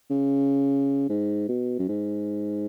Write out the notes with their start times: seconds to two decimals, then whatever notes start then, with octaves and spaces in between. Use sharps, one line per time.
0.10 C#3
1.09 G#2
1.49 B2
1.79 F#2
1.88 G#2